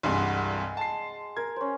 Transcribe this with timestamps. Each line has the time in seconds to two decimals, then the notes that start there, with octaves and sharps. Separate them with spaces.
0.03 C2 G2 E3 G#3 F#5 C6
0.77 A5 C7
1.37 A#4 G#6
1.56 C#4 C5